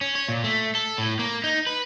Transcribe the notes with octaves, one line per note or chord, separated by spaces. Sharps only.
C#4
C#5
A#2
A3
A4
A2
A#3
D#4
B4